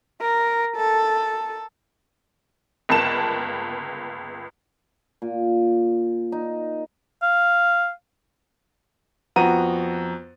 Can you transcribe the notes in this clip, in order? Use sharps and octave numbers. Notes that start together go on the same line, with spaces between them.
A#4
A4
G1 C#2 A#3 A5 E7
A#2
D#4
F5
F2 B3 F#4 A#5 D#7